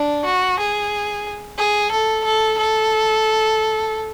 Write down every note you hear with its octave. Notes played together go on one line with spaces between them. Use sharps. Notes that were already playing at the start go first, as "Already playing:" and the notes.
Already playing: D4
F#4
G#4
G#4
A4
A4
A4